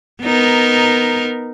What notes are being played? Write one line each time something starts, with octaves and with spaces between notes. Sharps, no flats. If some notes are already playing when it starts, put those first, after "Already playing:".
B3 D#4 A#4